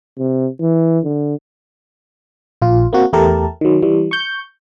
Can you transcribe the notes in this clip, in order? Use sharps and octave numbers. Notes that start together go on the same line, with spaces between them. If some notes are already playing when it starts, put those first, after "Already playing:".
C3
E3
D3
A#1 F4
A#3 C4 F#4
E2 A3 G4 A#4 A5
D#3 F#3
E3 G3
C#6 G6